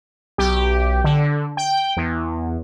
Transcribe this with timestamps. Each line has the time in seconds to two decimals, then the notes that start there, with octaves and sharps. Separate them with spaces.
0.38 B1 G4
1.04 D3
1.57 G5
1.97 E2